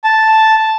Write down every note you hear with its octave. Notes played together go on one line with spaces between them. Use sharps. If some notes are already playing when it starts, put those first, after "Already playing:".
A5